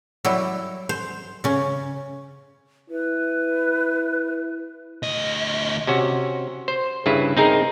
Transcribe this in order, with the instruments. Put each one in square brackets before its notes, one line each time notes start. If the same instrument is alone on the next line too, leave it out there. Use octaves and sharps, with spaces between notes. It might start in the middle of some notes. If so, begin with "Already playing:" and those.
[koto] F#3 G3 E4
C5
C#3 C#4
[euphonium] E4 [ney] B4
[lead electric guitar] D2 D#5
[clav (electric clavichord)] C3 C#4 F#4
C5
G2 C#3 E4 B4
C4 D#4 G#4 A#4